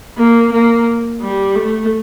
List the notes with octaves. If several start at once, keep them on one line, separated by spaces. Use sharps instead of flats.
A#3
A#3
G3
A3